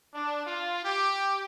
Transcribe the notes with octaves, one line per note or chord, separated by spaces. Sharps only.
D4
F4
G4